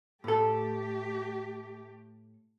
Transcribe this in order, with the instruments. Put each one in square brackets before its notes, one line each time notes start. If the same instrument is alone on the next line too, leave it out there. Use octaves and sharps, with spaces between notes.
[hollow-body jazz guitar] A2 A4 [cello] A3 G4